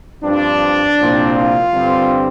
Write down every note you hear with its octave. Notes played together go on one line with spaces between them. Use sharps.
G2 F3 C4 D4
C2 A#2 F3 C4
F4
G2 D3 G3 C4